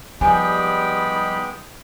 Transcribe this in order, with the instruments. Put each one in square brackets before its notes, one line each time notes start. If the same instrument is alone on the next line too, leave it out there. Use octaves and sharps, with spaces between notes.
[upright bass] F3 [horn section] G3 D#4 B5 [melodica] G#3 B3 G5 [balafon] G#5